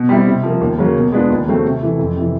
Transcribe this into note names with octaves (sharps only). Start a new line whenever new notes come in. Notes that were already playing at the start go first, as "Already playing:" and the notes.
Already playing: B2
G3 C4 E4
C3
F3 A#3
D#2
C#3 F#3 A#3
B2
G#3 B3 D4 F4
D#2
C#3 F#3 A3 C4
C3
E3 A3
F2
C3 E3